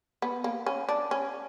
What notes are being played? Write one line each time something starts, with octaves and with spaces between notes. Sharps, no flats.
B3
A#3
C#4
D4
C#4